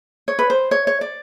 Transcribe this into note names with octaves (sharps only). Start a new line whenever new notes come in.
C#5
B4
C5
C#5
C#5
D5